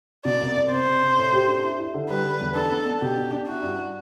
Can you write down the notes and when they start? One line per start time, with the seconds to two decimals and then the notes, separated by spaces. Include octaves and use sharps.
0.25 B2 D5
0.41 C2
0.57 C2
0.71 C3 C5
0.87 C3
1.02 C3
1.18 A2
1.33 G4
1.48 D4
1.63 E4
1.79 E4
1.94 D3
2.09 G3 B4
2.25 D3
2.41 E2
2.55 D4 A4
2.71 B3
2.86 B3
3.01 B2 G4
3.17 D4
3.32 D4
3.47 E4 F#4
3.62 G2